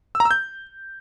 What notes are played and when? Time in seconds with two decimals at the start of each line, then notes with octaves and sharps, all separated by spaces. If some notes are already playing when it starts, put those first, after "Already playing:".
0.15 E6
0.20 A#5
0.25 E6
0.31 G6